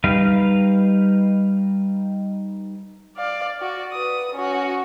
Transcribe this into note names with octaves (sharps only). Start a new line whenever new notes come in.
G3 D#4 B4 F5
D5 F5
F#4 D5
B4 D#6
C#4 F#4